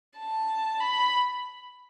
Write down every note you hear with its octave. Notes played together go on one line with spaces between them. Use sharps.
A5
B5